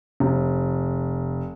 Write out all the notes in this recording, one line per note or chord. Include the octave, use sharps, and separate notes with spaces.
F1